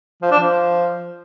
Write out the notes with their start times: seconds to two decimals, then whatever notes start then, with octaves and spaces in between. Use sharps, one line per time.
0.22 F3
0.31 D4
0.40 F3